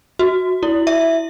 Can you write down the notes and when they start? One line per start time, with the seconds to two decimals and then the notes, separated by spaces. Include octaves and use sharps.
0.19 F#4
0.63 E4
0.87 E5